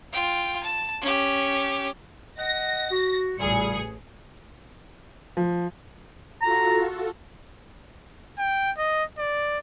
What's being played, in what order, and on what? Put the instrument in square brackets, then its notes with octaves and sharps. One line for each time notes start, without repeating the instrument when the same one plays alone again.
[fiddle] F4 G5
A5
C#4 G4
[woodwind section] D#5 F#5 [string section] A#6
[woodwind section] F#4
[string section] A1 G#4 C#7 [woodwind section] A#2 C#3 G3
[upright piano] F3
[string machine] F4 F#4 A4 [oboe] A#5
[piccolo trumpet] G5
D#5
D5